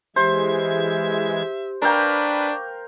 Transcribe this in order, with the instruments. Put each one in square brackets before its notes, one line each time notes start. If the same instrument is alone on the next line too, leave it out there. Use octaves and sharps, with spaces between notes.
[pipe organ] E3 G#3 G#6 [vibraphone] G4 [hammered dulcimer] C5 [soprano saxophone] E5
[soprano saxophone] D4 [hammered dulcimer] A#4 F5 G5 [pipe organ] B4 [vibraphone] C#6 D6